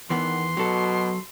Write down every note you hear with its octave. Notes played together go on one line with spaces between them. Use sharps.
E2 D#3 E3 B3 C6
B2 F#3 A4